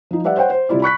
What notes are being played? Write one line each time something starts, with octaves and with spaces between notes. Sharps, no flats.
F3 D#4
G3 B4 D5 E5 F#5
C5 C#5 F#5 G5
C5
C3 G3 E4 F4 D5
B5 C#6 F#6 B6